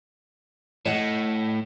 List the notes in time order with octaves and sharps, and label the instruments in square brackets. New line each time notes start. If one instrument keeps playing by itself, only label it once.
[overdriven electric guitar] A2 [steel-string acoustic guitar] C#5 D#5 F#5